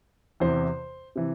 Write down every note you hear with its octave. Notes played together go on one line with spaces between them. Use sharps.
E2 C3 E3 C5
C3 E3